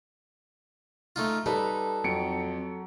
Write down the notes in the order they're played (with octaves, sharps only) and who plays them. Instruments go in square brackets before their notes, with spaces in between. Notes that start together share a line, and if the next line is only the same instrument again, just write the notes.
[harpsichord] A3 D#4 F4
[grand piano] G3 B4 [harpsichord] D#4 [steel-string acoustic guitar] A4
[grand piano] F2 [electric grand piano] F#3 C#7 D7